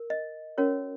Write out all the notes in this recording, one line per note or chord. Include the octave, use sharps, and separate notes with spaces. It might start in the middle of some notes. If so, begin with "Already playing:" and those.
Already playing: A#4
D#5
C#4 F#4 A#4 C#5